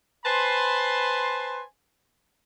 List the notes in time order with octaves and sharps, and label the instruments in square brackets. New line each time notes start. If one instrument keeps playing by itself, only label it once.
[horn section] B4 C5 G#5 A5 B5 C6